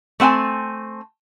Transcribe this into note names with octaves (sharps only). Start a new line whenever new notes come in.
A3 C4 F#5 G#5 A5